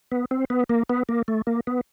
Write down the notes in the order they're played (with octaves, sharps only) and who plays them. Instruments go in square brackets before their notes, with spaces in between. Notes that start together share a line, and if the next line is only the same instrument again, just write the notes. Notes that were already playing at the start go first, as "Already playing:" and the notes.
[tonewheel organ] B3
C4
B3
A#3
B3
A#3
A3
A#3
B3